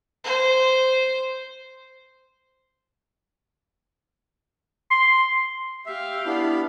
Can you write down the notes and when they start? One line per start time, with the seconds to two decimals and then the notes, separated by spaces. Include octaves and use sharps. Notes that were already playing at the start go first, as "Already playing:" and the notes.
0.24 C5
4.91 C6
5.86 G4 E5 F5
6.26 B3 D4 E4 B5